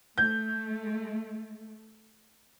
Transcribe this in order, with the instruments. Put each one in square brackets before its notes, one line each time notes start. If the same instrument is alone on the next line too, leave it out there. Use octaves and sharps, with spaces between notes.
[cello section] A3 [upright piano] G6